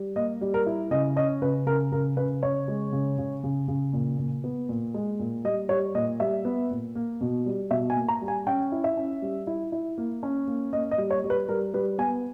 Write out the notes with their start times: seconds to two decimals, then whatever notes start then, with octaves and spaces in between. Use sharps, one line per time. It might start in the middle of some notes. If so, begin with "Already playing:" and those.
Already playing: G3
0.16 A#3 D#5
0.41 G3
0.54 A#4
0.66 E4
0.91 C#3 D#5
1.16 C#4 D#5
1.42 C#3 B4
1.66 C#3 A#4
1.92 C#3 A#4
2.17 C#3 B4
2.43 C#3 C#5
2.68 G#3
2.93 C#3
3.18 C#3
3.44 C#3
3.68 C#3
3.93 A#2
4.19 A#2
4.44 B3
4.69 A#2
4.94 G#3
5.19 A#2
5.44 G3 D#5
5.69 G3 C#5
5.95 A#2 D#5
6.20 G3 E5
6.45 B3
6.71 A#2
6.95 A#3
7.21 B2
7.46 G3
7.71 B2 E5
7.90 G#5
7.96 A#3
8.08 A#5
8.22 G3
8.28 G#5
8.47 C#4 G5
8.72 E4
8.84 E5
8.97 C#4
9.22 G3
9.47 E4
9.72 E4
9.98 A#3
10.23 C#4
10.48 A#3
10.73 A#3 D#5
10.91 D#5
10.98 G3
11.10 C#5
11.24 G3
11.30 B4
11.48 G3 A#4
11.74 G3 B4
11.98 B3 G#5